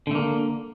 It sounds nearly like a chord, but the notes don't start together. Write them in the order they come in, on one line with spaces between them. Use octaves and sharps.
D3 A3 A#3